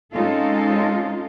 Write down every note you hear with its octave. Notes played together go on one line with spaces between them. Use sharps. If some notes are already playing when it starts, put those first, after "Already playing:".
G#3 C4 C#4 D#4 F4 A4